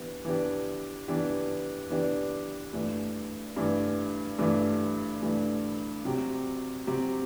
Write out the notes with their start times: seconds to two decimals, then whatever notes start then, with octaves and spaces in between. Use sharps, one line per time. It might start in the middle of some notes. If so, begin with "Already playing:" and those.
Already playing: E3 B3 D4 G4
0.25 E3 B3 D4 G4
1.08 E3 B3 D4 G4
1.90 E3 B3 D4 G4
2.73 G2 E3 A3
3.56 G2 E3 A3
4.38 G2 E3 A3
5.22 G2 E3 A3
6.05 C3 F#3 C4 G4
6.87 C3 F#3 C4 G4